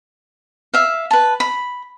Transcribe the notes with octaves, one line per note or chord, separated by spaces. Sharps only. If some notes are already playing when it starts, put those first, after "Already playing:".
E5 F5
B4 A5
B5